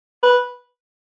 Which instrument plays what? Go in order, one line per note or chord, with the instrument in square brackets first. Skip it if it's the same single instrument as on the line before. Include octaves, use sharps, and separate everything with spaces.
[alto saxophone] B4